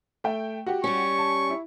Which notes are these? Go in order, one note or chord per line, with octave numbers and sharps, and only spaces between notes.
A3 G5
F#4 G4
G3 C#4 C#6
A5
E4